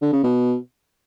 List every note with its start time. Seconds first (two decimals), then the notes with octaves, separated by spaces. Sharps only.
0.02 D3
0.13 C#3
0.23 B2